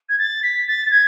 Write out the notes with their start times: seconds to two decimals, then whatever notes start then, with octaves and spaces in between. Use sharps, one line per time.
0.09 G#6
0.18 A6
0.43 B6
0.68 A6
0.86 A6
0.91 G#6